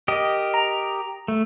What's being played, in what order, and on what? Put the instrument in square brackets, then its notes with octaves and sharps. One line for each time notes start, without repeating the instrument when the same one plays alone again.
[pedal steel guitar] G4 A#4 D#5
[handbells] A#5
[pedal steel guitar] A3